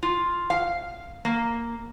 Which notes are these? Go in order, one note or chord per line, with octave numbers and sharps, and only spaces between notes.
F4
F5
A#3